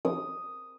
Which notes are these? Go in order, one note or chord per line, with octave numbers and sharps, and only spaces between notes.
D#6